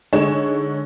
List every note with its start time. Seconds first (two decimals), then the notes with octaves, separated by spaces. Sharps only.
0.13 D3 G#3 D#4 C#5 E7